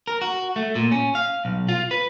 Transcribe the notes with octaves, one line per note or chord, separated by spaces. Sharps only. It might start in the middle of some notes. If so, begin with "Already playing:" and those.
A#4
F#4
A3
A#2
C#4
F5
B1
F4
B4